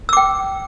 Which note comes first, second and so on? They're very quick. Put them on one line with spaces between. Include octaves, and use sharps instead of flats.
E6 D6 G5